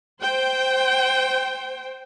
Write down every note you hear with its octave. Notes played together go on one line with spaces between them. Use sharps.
C5 G5